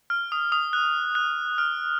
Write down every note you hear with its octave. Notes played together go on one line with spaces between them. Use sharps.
F6
D#6
D#6
F#6
F#6
F6